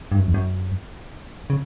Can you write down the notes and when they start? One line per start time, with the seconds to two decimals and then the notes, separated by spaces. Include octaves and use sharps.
0.12 G2
0.19 F#2
0.27 E2
0.34 F#2
1.50 C#3